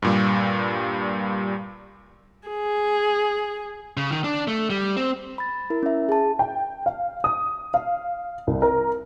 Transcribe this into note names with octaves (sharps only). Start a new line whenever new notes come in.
G2 A#2 G3
G#4
C#3
D#3
D4
A3
G3
C4
B5 A6
E4 A#4
C#4 E5
G#4 A5
G5
F5
D#6
F5
C2
A#4